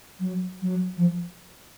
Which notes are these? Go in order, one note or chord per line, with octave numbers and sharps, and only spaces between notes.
F#3
F#3
F3